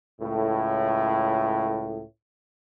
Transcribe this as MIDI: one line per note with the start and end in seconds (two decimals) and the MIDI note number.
0.21 2.01 37
0.21 2.01 45